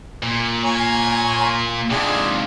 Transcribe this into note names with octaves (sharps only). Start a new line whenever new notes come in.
A#2
C#5 G#5 A#5
G#2 C3 D4 F4 G#4